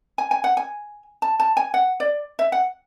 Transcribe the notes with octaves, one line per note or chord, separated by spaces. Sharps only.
G#5
G#5
F#5
G#5
A5
A5
G#5
F#5
D5
E5
F#5